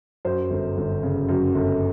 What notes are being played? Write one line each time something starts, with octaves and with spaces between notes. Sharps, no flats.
F#2 C5
G1
G1
C#3
F#2
G1